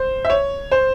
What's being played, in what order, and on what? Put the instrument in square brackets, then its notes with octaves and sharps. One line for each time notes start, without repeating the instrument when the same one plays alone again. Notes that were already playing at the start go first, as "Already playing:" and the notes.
Already playing: [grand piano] C5
E5
C#5
C5